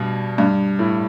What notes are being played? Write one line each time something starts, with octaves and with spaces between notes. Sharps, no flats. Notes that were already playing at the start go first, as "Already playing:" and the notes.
Already playing: G2 B2
G2
A2